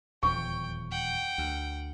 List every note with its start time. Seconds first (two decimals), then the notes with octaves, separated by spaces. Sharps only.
0.23 D#1 E2 F3 G5 C#6
0.91 F#5 G5
1.38 D2